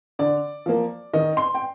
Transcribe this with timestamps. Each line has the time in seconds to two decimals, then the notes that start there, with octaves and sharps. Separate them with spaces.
0.19 D3 D5
0.66 F3 A#3
1.13 D#3 D#5
1.37 C6
1.54 G5